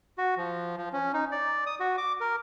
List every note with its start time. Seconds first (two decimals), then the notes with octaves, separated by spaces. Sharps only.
0.18 F#4
0.37 F3
0.77 F3
0.93 C#4
1.14 D#4
1.32 D5
1.66 D#6
1.80 F#4
1.98 D6
2.21 A#4